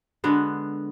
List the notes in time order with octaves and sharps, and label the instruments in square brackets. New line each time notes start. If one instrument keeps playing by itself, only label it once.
[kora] D3 G#3 B3